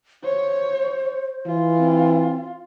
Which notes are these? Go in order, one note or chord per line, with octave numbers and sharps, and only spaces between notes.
C5 C#5
E3 F4
C4